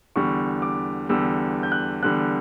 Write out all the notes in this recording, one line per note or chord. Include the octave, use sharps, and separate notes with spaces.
E2 D3 G3 C#6
D6
E2 D3 G3 E6
G6
F#6
E2 D3 G3 F#6